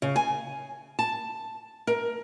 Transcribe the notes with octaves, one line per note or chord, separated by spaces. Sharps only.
C#3
G#5
A5
A#4